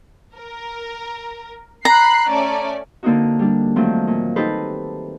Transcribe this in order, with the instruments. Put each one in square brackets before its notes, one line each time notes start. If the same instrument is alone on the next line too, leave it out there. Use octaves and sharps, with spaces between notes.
[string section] A#4
[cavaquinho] A#5 [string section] B5 F#6 C7
[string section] A3 C#4 D5
[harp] D3 A#3 C4 D#4 F#4
G3 D4
D#3 F3 F#3 A3 C4
A#2
D#4 G4 A4 B4 C5